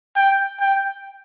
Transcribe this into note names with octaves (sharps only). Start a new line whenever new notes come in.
G5
G5